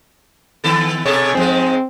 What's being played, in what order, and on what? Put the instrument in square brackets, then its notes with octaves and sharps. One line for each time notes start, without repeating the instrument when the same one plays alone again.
[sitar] D#3 B3 A4
[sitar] B2 G#4 A4 [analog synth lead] C#5
[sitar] G#2 F3 G#3 [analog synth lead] C4